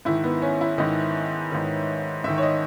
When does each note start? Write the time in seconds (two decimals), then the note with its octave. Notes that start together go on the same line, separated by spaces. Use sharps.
0.05 G#2 D#3 E4
0.24 B3
0.42 C#4
0.61 E4
0.78 G#2 D#3 D#5
1.52 G#2 D#3
2.24 G#2 D#3 E5
2.38 C#5
2.42 D#5